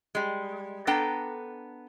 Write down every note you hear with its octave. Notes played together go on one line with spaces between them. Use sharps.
G3 G#3
B3 D4 A4 G5 A#5